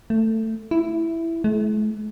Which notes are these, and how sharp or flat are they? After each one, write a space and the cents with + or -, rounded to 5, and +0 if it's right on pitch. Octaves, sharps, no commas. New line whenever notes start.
A3 +15
E4 +5
A3 -45